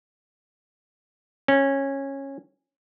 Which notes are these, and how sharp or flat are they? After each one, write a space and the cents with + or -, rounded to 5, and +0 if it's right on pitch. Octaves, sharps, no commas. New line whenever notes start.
C#4 -15